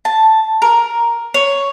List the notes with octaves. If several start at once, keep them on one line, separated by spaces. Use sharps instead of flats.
A5
A#4
C#5